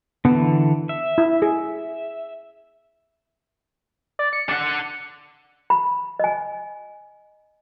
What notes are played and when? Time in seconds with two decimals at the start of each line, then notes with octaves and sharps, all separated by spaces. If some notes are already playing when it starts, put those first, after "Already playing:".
0.25 D3 E3 B3
0.89 E5
1.18 E4
1.42 G#4
4.19 D5
4.33 C#7
4.49 D4 F#5
5.70 B5
6.19 D#5 G#5